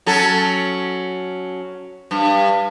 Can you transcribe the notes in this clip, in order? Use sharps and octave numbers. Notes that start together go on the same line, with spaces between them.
F#3 C#4 A4
G2